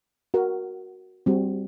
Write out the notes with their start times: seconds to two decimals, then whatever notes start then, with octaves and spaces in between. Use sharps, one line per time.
0.34 F#4 A#4 F#5
1.26 G3 C4 F#4